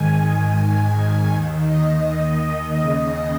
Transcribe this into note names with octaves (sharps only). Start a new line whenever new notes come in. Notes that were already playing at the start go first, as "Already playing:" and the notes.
Already playing: G#2 D#3 G#5
D#2 D#3
D#5
D#2 C#3